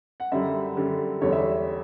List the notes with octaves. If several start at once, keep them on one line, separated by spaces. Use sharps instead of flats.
F#5
F#2 D3 G3 E5
F#2 D3 G3
E2 D3 G3 C#5
E5